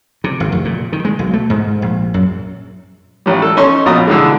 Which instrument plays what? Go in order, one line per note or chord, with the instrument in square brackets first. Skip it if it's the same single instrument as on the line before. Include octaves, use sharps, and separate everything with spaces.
[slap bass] C3
G#1
F1
A#2
D#3
G#3
B1
A3
G#2
A#1
F#2
[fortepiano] A1 G3
A4
C#4 D#4 C6 C#6
A#1 B2 F4 A#5 D#6
D3 E3 G#3